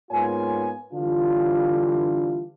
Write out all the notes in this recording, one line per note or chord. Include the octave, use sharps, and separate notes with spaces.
G#2 A#3 B3 F4 C#5 G#5
D3 E3 G3 D4 F4